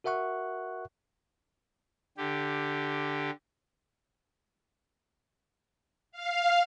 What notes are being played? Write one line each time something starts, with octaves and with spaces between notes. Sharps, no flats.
F#4 A#4 E5 F#5 C#6 F#6
D3 G4
F5